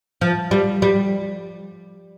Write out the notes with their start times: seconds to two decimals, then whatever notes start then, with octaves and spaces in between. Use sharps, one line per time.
0.21 F3
0.51 G3
0.82 G3